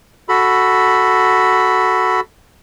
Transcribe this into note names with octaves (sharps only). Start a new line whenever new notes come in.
F#4 A4 B5